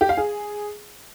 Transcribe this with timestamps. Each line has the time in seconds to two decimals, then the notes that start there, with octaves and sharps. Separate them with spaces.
0.01 G4
0.09 F5
0.17 G#4